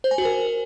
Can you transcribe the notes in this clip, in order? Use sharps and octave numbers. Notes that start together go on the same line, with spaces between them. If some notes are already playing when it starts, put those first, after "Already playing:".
C5
G#5
F#4
A#4